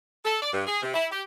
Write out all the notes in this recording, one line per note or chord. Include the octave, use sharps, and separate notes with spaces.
A4
D5
G2
G#4
C3
E4
G4